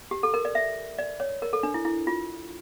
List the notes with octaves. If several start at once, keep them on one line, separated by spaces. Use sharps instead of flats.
G4
A4
A#4
D5
E5
D5
C#5
A#4
A4
D4
E4
E4
F4